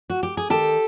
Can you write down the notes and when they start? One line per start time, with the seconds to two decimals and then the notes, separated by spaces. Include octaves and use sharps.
0.10 F#4
0.23 G4
0.37 G#4
0.50 D#3 G4 A4